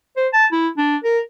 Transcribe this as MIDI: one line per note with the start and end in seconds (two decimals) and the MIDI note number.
0.17 0.28 72
0.33 0.46 81
0.52 0.68 64
0.77 0.97 62
1.04 1.20 70